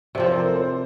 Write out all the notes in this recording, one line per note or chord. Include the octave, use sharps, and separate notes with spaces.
C3 F3 C4 D5
C5
A#4
A4
C5